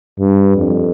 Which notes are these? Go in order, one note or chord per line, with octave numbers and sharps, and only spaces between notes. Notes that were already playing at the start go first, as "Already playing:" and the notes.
G2
F2